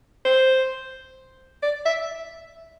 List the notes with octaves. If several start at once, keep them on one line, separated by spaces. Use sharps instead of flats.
C5
D5
E5